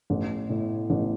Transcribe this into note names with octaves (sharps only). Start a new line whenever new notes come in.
A1
A2
A1